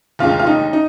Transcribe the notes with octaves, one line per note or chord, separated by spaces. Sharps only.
F1 D#2 D3 G#3 F4
F4
D#4
D#4